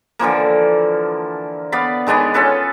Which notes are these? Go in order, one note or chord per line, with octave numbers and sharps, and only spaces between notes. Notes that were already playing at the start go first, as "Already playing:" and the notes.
D3 E3 F3 A#3
B3 D5 F5 B5
D#3 G#3 B3 D4
C#4 F4 A4 B4